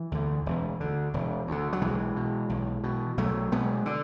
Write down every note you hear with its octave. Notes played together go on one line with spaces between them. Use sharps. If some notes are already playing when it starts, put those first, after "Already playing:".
Already playing: E3
D2 D3
E1
D2 D3
E1
D2 D3
F#3
B1 E3 G#3
B2
B1
B2
B1 F#3 A3
B2 G#3 B3
D3